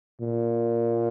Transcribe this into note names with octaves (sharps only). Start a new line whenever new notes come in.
A#2